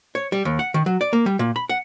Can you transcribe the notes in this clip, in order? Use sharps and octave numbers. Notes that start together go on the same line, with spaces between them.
C#5
G3
D#2
F#5
D#3
F#3
D5
A#3
G3
A#2
B5
F#5